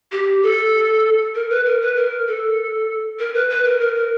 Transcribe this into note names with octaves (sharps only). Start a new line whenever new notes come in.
G4
A4
A#4
B4
A#4
B4
A#4
A4
A#4
B4
B4
A#4
A#4
A#4